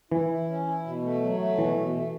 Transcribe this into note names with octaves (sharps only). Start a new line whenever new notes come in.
E3 E4
E4
C#4
E4
B2
A3
F#3
A3
B2 E3
B2
A3